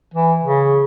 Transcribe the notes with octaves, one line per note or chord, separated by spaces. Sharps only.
E3
C#3